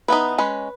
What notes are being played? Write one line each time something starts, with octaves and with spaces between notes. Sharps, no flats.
E3 B3 D#4 B4
G#3 C#4 B4